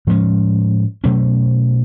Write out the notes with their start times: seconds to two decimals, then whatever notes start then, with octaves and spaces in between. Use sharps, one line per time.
0.07 A2 F3 G#3 C#4
1.04 B2 F#3 A3 C#4